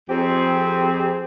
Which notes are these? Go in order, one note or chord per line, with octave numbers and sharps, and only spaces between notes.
F2 C4 G4 G#4